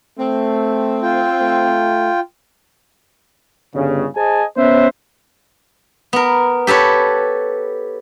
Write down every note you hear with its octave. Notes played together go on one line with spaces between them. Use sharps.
A3 C4
F4 G5
A3
G1 C#3
G#4 C5 D#5 G#5 A5
B3 C#4 B4 C5 E5
B3 A#4
G4 A4 B4 C#5